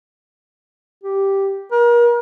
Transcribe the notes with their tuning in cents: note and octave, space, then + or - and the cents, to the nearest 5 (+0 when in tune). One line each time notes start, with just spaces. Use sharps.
G4 -5
A#4 +35